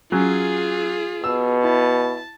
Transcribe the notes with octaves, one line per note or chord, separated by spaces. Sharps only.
F#3 C#4 F4 G#4
B2 E6
E4 A5